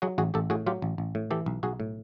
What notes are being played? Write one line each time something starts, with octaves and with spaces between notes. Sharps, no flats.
F#3 F#4 G#4
A1 F#4 G#4
A1 G4 A4
A2 F#4 G#4
F#3 F4 G4
A1
A1
A2
E3 G4 A4
B1
B1 F#4 G#4
A2